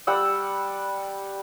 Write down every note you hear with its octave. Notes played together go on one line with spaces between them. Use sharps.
G3 F#5 E6